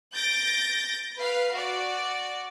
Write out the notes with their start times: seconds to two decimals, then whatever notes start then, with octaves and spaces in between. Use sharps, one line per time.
0.13 G6 A6 A#6 D7
1.17 B4 F5
1.52 F#4 D5